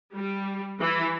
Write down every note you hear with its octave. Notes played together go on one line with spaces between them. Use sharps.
G3
E3